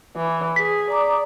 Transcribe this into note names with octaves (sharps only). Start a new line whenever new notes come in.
E3
G#4 B6
D5 A#5 D6 D#6